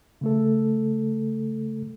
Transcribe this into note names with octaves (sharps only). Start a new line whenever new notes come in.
C#3 A3 A4